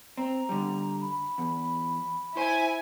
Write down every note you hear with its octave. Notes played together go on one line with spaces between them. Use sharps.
C4 A#5
D3 G3
B5
E2
E4 C5 G#5